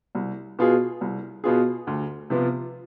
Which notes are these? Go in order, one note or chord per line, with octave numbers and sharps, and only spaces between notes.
C2
B2 B3 F4 G#4
C2
B2 B3 F4 G#4
D2
C3 F3 B3 F4